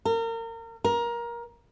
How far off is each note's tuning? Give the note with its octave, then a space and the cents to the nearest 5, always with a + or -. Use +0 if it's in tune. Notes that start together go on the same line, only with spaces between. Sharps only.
A#4 -30
A#4 +20